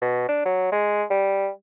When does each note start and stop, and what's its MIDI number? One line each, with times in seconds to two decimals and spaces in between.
0.01 0.25 47
0.29 0.44 62
0.45 0.71 54
0.72 1.03 56
1.10 1.49 55